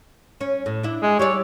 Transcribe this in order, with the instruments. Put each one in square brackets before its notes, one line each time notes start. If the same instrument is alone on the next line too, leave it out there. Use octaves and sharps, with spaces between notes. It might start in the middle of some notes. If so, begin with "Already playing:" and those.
[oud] C#4
A2
D4 E4
[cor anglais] G#3
[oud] G3 E4 D5 [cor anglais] C#5